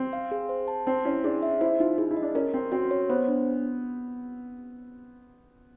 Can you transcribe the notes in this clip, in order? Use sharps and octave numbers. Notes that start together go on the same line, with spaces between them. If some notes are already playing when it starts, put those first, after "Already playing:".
Already playing: C4
F5
G#4
C5
A5
C4 C5
C#4 E4
D4 G#4
E5
E4 C5
D#4 F4
E4 G#4
E4
D#5
D4
C#4 A#4
C4 C#4
C4 F#4
C#5
B3 C5
D4